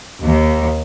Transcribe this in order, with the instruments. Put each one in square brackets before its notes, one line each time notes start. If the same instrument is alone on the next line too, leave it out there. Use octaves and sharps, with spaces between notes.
[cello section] D#2